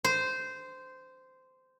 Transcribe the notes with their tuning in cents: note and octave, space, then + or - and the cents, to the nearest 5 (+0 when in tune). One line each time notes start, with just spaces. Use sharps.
C5 -15